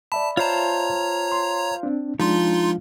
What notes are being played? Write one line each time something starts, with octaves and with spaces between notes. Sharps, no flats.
D5 E5 A5 B5
F4 C5 C#5 A5 A#5
C6
C4 D4
F3 G#3 D4 D#4 F4 C6